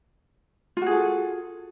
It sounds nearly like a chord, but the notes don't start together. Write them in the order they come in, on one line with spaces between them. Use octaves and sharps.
F4 F#4 G#4 A4